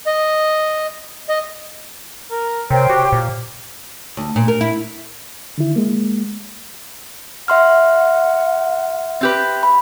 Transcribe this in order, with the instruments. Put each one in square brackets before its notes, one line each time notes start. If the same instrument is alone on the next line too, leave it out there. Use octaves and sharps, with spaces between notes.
[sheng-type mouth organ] D#5
D#5
[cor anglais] A#4
[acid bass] C3 [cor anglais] A#4 [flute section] C5 C#5 G5
[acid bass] F#4 [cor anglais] G4
[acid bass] A#2
[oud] D2
A#2
A#4
E4
[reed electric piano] D3 D#3 E4
G#3 A#3
[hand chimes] E5 C6 F6 [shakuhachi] F#5
[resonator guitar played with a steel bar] C4 G4 B4
[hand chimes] B5